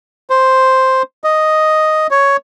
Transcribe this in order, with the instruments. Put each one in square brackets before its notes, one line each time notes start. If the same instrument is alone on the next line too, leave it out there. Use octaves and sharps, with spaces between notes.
[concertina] C5
D#5
C#5